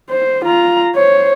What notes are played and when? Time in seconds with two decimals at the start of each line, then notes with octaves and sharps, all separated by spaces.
0.10 C5
0.45 F4 A#5
0.95 C5 C#5